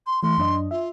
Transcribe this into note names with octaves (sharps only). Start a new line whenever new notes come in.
C6
E3 A3 C6
F#2 D4 D#5
F4 E5